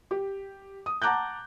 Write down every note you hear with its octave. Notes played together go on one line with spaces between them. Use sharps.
G4
D#6
F#5 A5 A#5 D6 F#6 G6